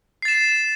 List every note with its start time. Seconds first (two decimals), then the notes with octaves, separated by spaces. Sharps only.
0.22 C7
0.25 A6
0.28 E7